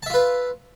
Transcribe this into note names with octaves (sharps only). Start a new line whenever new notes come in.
F4 B4 E5 A5